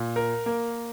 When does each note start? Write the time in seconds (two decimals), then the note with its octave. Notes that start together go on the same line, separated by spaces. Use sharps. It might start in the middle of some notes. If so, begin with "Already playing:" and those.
Already playing: A#2
0.16 A#4
0.46 A#3